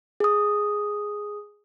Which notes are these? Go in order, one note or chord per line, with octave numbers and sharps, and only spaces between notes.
G#4 D#6